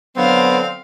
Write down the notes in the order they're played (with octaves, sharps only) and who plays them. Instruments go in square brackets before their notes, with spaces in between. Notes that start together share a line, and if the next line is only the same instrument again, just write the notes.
[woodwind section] D3 F#3 [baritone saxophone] B3 [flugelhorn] C4 [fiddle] F5